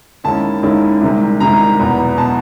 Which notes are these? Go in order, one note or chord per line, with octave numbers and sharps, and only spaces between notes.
D#2 D#3 G#3 C#4 E4 A5
D#2 D#3 G#3 C#4 E4
C2 C3 D#3 G#3
C2 C3 D#3 G#3 A#5
E2 B2 F#3 B3
B2 F#3 B3 A5